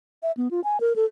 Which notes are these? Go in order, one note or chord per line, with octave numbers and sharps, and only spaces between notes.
E5
B3
F4
G#5
A#4
A4